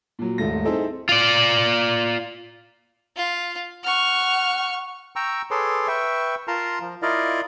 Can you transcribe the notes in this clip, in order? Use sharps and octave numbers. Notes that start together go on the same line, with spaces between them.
A#2 F#3
D#1 G#2 A3 A#6
C4 D#4 E4 G#4 A4 E5
F4 D5
F4
F#5 C#6 F6
G5 A#5 C#6 E6
G#4 A4 B4 C#5 C6 D6
B4 E5 G5 C#6
F4 A#4 A5 A#5 C6
F3
E4 F4 A#4 D5 D#5 F5